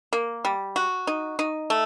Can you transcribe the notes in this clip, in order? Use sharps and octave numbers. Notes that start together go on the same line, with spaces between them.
A#3
G3
F#4
D#4
D#4
A3